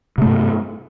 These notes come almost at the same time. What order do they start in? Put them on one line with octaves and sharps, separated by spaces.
C3 A3 G2